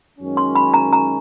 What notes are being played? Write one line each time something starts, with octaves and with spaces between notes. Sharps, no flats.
F#2 D#3 G#3 C#4
C6
B5
A#5
A#5